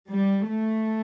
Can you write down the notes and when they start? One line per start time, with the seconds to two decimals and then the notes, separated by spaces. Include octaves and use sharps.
0.10 G3
0.48 A3